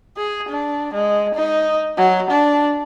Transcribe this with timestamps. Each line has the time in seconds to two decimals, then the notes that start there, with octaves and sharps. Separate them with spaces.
0.17 G#4
0.49 D4
0.93 G#3
1.35 D#4
1.97 F#3
2.30 D4